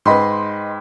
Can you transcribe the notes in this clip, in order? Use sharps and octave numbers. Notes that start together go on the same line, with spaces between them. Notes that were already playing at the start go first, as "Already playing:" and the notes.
G#2 B4 D#5 G5 B5 C6